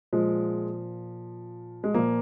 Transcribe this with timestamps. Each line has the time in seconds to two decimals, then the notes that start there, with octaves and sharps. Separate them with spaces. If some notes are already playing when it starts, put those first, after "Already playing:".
0.13 A#2 F3 G#3
1.84 G#3
1.94 A#2 F3 A#3